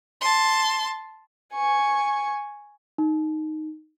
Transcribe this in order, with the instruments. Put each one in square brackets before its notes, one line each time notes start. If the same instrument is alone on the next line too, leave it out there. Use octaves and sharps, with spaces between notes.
[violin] A5 C6
G#5 C#6
[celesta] D#4